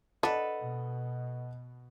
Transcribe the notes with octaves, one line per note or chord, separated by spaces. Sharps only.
D4 A4 B4 D#5 F#5
B2